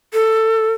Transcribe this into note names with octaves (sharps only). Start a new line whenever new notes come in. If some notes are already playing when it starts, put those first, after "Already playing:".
A4